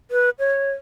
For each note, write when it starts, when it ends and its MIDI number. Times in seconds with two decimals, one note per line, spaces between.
0.11 0.30 71
0.39 0.72 73